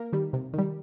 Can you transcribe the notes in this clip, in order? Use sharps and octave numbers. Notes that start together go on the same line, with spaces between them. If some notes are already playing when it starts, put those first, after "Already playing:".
Already playing: A#3 A#4
D#3 G3
C3
D#3 G3